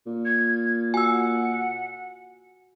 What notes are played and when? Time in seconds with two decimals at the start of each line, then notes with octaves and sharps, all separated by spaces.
0.06 A#2
0.25 G#6
0.94 F#4 F#5 G#5 E6